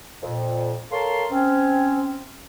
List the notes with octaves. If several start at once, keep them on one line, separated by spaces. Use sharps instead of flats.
F2 A#2
A4 A#4 C#5 F5 A5 C6
C4 C#4